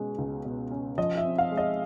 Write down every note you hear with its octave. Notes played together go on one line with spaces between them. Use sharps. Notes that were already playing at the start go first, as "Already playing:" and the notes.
Already playing: B2 G#3 C#4
C#2
B2
C#4
F3 D#5
E5
C4
F5
G#3
D#5